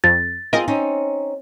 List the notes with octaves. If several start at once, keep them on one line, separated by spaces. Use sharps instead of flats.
F2 A6
C4 F4 G#4 A#4 D#5
C4 C#4 D#4